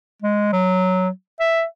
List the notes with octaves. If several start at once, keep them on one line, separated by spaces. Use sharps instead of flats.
G#3
F#3
E5